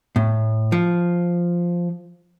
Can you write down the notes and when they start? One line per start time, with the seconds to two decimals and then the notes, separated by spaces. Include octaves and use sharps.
0.16 A2
0.72 F3